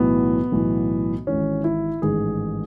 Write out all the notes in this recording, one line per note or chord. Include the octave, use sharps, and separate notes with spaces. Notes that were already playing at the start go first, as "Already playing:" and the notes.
Already playing: B1 A2 E3 B3
B1 A2 E3
G#1 G#2 E3 C#4
E4
A1 G#2 D#3 G#4